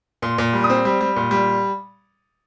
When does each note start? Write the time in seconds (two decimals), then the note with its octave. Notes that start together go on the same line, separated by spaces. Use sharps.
0.22 A#2 C6
0.38 A#2
0.53 G3
0.64 D#6
0.70 C4
0.85 G3
1.01 G3
1.16 A#2
1.31 G3